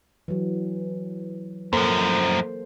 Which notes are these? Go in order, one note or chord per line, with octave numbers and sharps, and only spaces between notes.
E3 F#3
F#2 F3 A#3 A4 C5